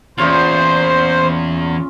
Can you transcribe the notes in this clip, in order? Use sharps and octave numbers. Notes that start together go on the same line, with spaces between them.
E2 A#2 C#3 F4 C5